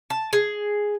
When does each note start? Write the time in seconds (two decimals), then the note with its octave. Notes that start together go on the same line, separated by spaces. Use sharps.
0.10 A5
0.33 G#4